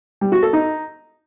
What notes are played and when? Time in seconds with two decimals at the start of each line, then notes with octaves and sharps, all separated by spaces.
0.21 G3
0.32 F#4
0.43 A4
0.53 D#4